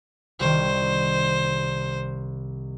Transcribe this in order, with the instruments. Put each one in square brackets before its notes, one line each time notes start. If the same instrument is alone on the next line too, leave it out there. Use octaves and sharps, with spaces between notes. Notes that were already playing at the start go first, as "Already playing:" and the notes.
[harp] C2 D#3 [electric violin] C5